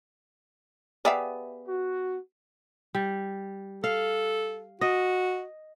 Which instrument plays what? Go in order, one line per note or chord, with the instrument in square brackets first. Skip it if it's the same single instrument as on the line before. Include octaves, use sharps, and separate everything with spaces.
[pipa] B3 G4 G#4 [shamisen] D5 E5 F5
[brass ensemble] F#4
[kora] G3
[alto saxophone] A4 [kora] F5
[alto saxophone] F#4 [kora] D#5